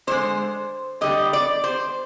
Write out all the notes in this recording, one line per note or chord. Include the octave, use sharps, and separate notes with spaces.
D3 G#3 C5
D3 G3 D#5
D5
C5